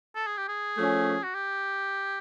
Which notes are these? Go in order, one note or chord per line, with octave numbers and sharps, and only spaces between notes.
A4
G#4
G4
G#4
F3 A3 C#4
F#4
G4